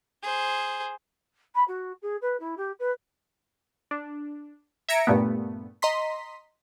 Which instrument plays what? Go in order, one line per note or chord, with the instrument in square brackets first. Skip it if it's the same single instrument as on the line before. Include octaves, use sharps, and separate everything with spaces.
[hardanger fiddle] G#4 C5
[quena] B5
F#4
G#4
B4
E4
G4
B4
[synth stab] D4
E5 A#5 G#6 A#6 C#7 D7
G2 A#2 A3 B3
D#5 A#5 C6 B6